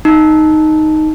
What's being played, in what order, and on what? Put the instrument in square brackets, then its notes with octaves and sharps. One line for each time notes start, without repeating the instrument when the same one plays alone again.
[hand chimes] D#4